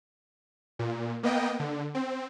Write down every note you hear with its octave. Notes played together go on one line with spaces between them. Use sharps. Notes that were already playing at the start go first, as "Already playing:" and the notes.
A#2
A#3 B3 D#5 G5
D3
C4